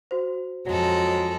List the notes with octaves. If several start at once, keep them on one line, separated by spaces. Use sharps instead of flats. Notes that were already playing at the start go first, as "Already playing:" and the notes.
F#4 C5
F2 F#3 G#3 A4